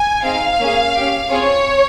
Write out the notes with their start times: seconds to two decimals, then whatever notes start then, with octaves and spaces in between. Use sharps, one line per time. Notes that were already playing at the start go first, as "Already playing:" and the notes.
Already playing: G#5
0.23 C4 D#4 G#4 F5
0.59 A#3 C#4 G#4
0.95 C#4 G4
1.31 C4 F4 G#4 C#5